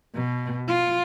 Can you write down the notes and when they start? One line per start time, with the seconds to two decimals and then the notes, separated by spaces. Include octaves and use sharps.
0.15 B2
0.68 F4